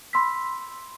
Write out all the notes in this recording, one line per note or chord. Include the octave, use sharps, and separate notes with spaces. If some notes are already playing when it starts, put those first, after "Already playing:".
B5 C6 E6 B6